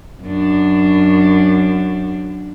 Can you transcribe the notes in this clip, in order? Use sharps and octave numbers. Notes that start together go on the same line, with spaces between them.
F#2 D4